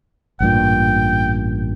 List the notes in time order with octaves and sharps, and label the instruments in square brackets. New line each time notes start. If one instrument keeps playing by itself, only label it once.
[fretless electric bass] A1 G2 A#2 [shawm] G5